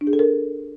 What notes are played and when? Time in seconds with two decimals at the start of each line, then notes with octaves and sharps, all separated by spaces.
0.01 D4
0.07 G#4
0.13 A4
0.19 A#4